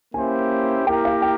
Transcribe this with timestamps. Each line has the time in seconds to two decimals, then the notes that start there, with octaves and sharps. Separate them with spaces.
0.14 A#3 C#4 E4 G4 C5 G#5
0.86 A#3 E4 G4 A#4 G5
1.05 F5
1.22 G5